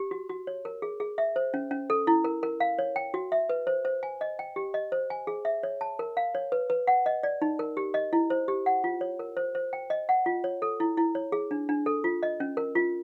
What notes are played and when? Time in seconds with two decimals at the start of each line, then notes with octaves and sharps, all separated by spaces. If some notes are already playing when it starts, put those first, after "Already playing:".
Already playing: G4
0.11 F#4
0.29 F#4
0.47 C#5
0.65 A#4
0.82 G#4
1.00 G#4
1.18 E5
1.36 C5
1.54 C#4
1.71 C#4
1.90 A4
2.07 E4
2.24 A#4
2.43 A#4
2.60 F5
2.79 C#5
2.96 G5
3.14 F#4
3.32 E5
3.49 B4
3.67 C5
3.85 C5
4.03 G#5
4.21 D#5
4.39 G5
4.56 G4
4.74 D#5
4.92 C5
5.10 G#5
5.27 G#4
5.45 E5
5.63 C#5
5.81 A5
5.99 A#4
6.17 F5
6.35 C#5
6.52 B4
6.70 B4
6.87 F#5
7.06 D#5
7.23 D5
7.42 D#4
7.59 A#4
7.77 G4
7.94 D#5
8.13 E4
8.30 C5
8.48 G4
8.66 F#5
8.84 F4
9.01 C#5
9.19 A#4
9.37 C5
9.55 C5
9.73 G5
9.90 D#5
10.09 F#5
10.26 F4
10.44 C#5
10.62 A4
10.80 E4
10.97 E4
11.15 C#5
11.32 G#4
11.51 D4
11.69 D4
11.86 A4
12.04 F4
12.23 D#5
12.40 C#4
12.57 A#4
12.75 F4